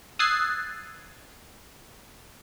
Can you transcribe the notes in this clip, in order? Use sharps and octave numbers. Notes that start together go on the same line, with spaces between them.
D#6 E6 F#6 G#6 A6 C7